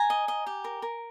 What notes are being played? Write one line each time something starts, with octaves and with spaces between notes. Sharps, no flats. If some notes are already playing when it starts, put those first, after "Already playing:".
Already playing: G#5 A#5
D#5
D#5
G4
A#4
A#4